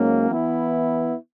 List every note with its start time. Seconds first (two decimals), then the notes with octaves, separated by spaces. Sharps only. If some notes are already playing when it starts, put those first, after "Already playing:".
Already playing: G#2 F#3 A#3 C#4
0.29 E3 B3 E4